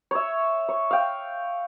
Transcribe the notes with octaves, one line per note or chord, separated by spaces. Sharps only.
C#5 E5
C#5
F5 G5